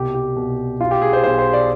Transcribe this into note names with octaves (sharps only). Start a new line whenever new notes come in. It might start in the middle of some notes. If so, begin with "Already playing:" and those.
Already playing: C2 B2 G4
G4
C2 B2
B1 B2 F4
G4
G#4
C5
B1 B2 C5
C5
D5